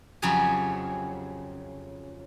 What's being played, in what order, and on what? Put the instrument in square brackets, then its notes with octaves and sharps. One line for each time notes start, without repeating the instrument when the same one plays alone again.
[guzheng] F2 C#3 F#3 G4 G#4 G#5